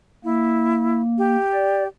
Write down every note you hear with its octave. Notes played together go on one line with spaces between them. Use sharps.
A#3 E4
G4
D5